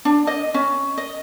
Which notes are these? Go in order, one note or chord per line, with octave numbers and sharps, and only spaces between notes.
D4
D#5
C#4
D#5